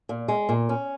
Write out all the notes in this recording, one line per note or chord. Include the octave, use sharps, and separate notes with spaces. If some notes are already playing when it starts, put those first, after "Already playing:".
A#2
G#3
A#2
C#4